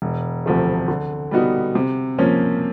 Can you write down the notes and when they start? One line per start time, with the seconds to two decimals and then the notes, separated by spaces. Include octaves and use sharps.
0.02 E1
0.46 D2 C3 F3 A3
0.88 D3
1.31 G3 B3 D#4 F#4
1.75 C3
2.18 F3 A#3 C#4